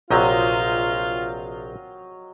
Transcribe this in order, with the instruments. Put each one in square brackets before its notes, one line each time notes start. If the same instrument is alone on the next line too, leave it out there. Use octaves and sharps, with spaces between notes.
[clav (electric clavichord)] A#1 C3 [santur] F#3 D#5 G5 [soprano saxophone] F4